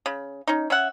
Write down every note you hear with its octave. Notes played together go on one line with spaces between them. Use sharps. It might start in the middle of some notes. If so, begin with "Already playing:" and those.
C#3
C#4 D#4
C#4 E5 F#5